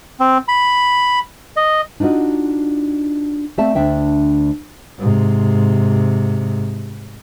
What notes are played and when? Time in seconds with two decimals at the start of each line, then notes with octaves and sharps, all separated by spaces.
0.20 C4
0.48 B5
1.57 D#5
2.00 D4 D#4 F4 F#4 D#5
3.58 A3 C4 D5 E5 F5 A5
3.75 D2 D4 E5 G5
4.99 G#2 C3